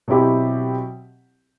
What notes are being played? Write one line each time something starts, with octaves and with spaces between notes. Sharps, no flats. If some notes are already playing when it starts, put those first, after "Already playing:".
B2 F#3 C4 E4 G4